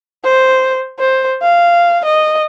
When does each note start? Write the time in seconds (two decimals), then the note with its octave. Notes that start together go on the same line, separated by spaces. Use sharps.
0.24 C5
0.99 C5
1.43 F5
2.05 D#5